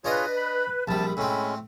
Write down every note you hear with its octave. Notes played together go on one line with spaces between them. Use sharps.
D4 F4 G#4 B4 C#5 D#5
B5
A#1 C3 G3 A5 B5
A2 G#3 C4 C#4